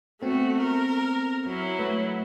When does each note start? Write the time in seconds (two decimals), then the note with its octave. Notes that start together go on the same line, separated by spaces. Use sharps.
0.22 A3 B3 C4 F#4 A4
0.61 A#4
1.46 F#3 E4
1.79 A3 B4